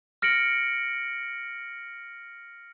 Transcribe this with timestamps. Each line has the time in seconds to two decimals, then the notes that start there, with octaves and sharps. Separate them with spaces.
0.22 F6 A#6 C#7 D7 F#7